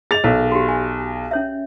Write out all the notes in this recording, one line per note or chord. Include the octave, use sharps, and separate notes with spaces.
G#4 D#5 A6 F7
B1 A#4
F#4 G4
G#5
C#4 C#5 E5